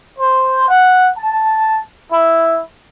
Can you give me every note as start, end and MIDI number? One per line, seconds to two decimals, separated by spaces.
0.19 0.67 72
0.68 1.10 78
1.17 1.81 81
2.11 2.59 64